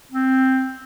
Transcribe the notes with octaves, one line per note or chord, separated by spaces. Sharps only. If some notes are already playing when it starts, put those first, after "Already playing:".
C4